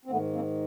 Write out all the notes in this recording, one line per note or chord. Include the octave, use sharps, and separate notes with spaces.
C4
G#2 D#3 A3 B3
A#3 C4